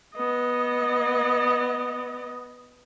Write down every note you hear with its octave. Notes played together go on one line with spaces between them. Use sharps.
B3 D#5